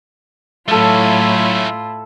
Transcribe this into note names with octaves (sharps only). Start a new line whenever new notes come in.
A2 F#3 A3 C#4 E4 F4 A4 F5